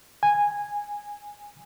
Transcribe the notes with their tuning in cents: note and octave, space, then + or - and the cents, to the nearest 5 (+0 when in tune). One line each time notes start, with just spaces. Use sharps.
G#5 -10